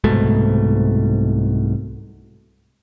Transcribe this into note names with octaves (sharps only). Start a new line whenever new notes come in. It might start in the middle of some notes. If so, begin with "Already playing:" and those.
C2 G#2 B2 A3